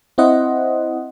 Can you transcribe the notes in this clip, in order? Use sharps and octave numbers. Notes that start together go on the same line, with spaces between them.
C4 E4 C5 D#5 F#5